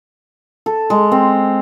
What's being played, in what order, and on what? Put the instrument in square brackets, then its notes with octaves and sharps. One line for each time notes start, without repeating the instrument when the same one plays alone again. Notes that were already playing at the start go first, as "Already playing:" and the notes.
[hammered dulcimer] A4
G#3
C4